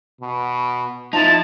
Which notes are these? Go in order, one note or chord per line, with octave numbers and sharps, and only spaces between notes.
B2
F3 D#4 E4 A5